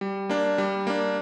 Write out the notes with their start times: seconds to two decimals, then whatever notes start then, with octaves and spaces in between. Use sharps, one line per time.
0.01 G3
0.29 A#3 D4
0.58 G3
0.87 A#3 D4